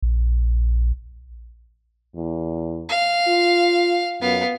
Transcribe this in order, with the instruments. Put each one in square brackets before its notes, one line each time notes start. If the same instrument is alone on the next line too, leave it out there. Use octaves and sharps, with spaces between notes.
[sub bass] A#1
[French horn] E2
[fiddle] F5
[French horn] F4
[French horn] F#2 [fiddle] B3 F5